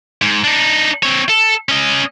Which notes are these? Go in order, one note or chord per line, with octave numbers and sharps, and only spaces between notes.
G#2
D4 D#4
C4 C#5
A4
C#4 D#5